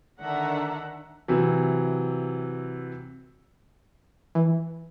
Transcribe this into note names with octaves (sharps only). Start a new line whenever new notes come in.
D3 D#3 D4 E5 F#5 A#5
C3 E3 F#3
E3